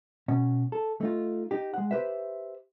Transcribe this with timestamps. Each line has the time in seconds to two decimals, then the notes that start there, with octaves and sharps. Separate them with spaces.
0.28 B2 C#4
0.72 A4
1.01 A3 D#4 F4
1.51 D#4 G4
1.74 G#3 F#5
1.91 G4 B4 C5 E5